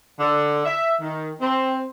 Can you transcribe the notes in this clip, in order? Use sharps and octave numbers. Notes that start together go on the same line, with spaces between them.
D3
E5
D#3
C4